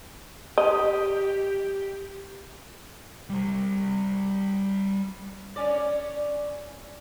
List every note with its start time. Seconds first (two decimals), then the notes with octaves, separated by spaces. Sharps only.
0.58 G4 D#5
3.30 G3 C5
5.56 C#4 D5